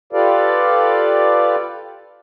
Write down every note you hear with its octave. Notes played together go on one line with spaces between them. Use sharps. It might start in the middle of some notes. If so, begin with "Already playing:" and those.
F4 G4 A4 B4 D5 F5